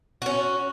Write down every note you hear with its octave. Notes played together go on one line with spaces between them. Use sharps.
C#4 F#4